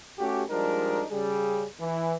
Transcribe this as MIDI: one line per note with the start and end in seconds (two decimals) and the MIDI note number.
0.19 0.43 57
0.19 0.43 61
0.19 0.43 66
0.19 0.43 67
0.50 1.04 53
0.50 1.04 55
0.50 1.04 56
0.50 1.04 62
0.50 1.04 63
0.50 1.04 70
1.11 1.65 49
1.11 1.65 55
1.11 1.65 68
1.80 2.15 52